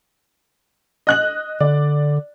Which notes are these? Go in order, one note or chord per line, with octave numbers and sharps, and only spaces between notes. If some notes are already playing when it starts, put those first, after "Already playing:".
D#5 F#6 F#7
D3 D5